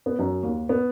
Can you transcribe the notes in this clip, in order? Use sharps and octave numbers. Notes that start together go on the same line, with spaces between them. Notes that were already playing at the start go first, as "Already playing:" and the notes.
B3
F#2
D#2
B3